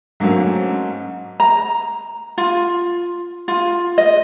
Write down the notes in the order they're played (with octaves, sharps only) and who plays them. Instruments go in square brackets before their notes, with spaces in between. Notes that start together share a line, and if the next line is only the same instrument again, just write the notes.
[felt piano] G#2 F#3 A3 A#3 C4 C#4
[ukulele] A#5
F4
F4
D#5